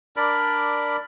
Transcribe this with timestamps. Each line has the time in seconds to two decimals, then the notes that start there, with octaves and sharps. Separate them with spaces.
0.17 D4 A#4 D5 B5